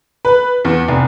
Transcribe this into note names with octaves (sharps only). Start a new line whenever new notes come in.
B4
E2
F1